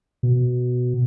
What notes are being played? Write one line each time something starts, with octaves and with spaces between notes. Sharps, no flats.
B2